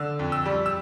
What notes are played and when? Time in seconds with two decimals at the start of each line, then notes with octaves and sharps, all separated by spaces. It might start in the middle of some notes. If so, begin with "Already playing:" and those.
Already playing: D3 E6
0.19 F2
0.32 E6
0.46 G3
0.66 E6